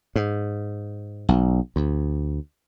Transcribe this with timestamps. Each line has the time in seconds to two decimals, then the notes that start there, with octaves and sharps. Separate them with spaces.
0.16 G#2
1.29 B1
1.76 D2